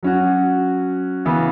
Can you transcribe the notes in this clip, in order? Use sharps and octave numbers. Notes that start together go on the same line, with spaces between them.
F#3 C#4 F#4
C#3 E3 B3